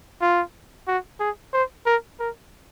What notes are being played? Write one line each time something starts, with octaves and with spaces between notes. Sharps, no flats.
F4
F#4
G#4
C5
A#4
A#4